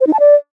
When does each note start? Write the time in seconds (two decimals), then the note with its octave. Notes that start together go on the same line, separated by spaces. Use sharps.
0.01 C5
0.07 D#4
0.13 A5
0.20 D5